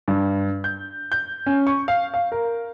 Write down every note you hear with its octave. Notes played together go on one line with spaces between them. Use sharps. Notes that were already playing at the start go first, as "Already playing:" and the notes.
G2
G6
G6
C#4
C#6
F5
F5
A#4